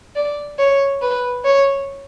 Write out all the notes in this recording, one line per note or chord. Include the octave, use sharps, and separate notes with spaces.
D5
C#5
B4
C#5